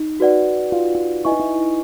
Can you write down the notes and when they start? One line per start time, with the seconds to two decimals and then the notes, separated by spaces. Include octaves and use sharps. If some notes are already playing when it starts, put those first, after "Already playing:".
Already playing: D#4
0.20 F#4 B4 D5 F#5
0.72 F4
0.95 F4
1.25 E4 B4 D#5 G#5 C#6
1.32 D#4
1.40 E4